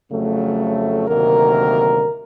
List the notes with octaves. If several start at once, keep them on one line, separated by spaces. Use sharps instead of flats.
F2 C#3 F#3 A3
D2 C3 D#3 F#3 A#3 A#4